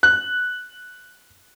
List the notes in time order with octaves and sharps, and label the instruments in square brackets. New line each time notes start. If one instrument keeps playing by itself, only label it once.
[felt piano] F#6